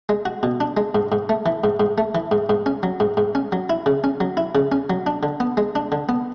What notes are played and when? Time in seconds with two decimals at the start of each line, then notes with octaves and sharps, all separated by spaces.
0.09 G#3
0.25 F#4
0.43 B2
0.60 D4
0.77 G#3
0.95 G#2
1.12 G#2
1.29 A3
1.46 E3
1.64 G#2
1.80 G#2
1.98 A3
2.15 E3
2.31 G#2
2.49 G#2
2.66 C#4
2.83 F#3
3.00 G#2
3.17 G#2
3.35 C#4
3.52 F#3
3.70 E4
3.86 C#3
4.04 C#4
4.20 F#3
4.37 E4
4.55 C#3
4.72 C#4
4.90 F#3
5.06 D4
5.23 D3
5.40 B3
5.57 G#3
5.75 D4
5.92 D3
6.09 B3